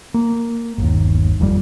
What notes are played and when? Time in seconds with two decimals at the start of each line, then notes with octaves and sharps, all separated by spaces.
0.14 A#3
0.78 G1 D#2
1.40 G#1 F2 C3 G3